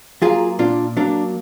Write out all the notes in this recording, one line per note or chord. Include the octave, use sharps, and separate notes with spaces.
F#3 A#3 F4 G#4
A#2 D4 F4
F#3 A#3 D4